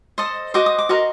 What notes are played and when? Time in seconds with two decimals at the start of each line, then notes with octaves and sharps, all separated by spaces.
0.18 A4 C5 D#5
0.54 F#4 C5 D#5 D6
0.66 D#6
0.79 D6
0.89 F#4 A#4 D#5 C6